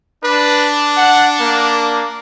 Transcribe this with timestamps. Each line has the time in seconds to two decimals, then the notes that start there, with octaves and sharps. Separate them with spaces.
0.24 D4 B4
0.97 F#5
1.40 A#3